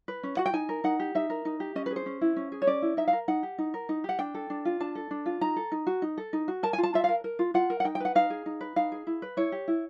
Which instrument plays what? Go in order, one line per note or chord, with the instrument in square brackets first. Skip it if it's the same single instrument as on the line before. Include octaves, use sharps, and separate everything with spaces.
[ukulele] B4
C#4
F#4 F#5
G5
D#4 G#5
A#4
D#4 F#5
G4
D#4 E5
A#4
D#4
G4
C#4 D#5
B4
G#4
C5
C#4
E4
C#4
G#4
C#5
C#4 D5
E4
D#4 E5
F5
A#4
D#4 F#5
G4
D#4
A#4
D#4
G4 F#5
D4 G5
A4
D4
F4
D4 A5
A4
D4
F4
D#4 A#5
A4
D#4
F#4
D#4
A4
D#4
F#4
A#4 A5
G#5
F4
A5
F4 E5
A#4 F5
A#4
F4
F4 F#5
A#4
F#5
D#4 G5
G5
B4 F#5
D#4 F5
G#4
D#4
B4
D#4 F5
G#4
E4
B4
E4 C#5
G4
E4